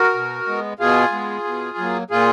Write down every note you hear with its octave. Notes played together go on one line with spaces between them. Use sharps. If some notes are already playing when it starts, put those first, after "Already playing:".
Already playing: F#4 A#4
B2
G#3 B3
B2 F4 G#4
G#3 B3
B2
F#3 A#3
A#2 F4 G#4